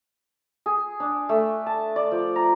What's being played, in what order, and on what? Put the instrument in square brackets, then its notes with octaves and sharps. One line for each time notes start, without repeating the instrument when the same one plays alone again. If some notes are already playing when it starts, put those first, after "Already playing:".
[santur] G#4
D4
A3
A5
D5
F3
A#5